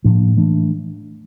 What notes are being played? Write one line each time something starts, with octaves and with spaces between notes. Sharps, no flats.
A2 F3 A#3 D4
E3 A3 D4